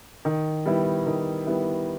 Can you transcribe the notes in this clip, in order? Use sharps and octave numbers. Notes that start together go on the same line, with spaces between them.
D#3
G3 B3 E4
D#3
G3 B3 E4